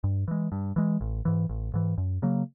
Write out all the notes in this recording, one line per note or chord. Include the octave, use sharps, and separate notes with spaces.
G2
E3 G#3
G2
E3 G#3
A1
G#2 E3
A1
G#2 E3
F#2
C#3 F#3 A#3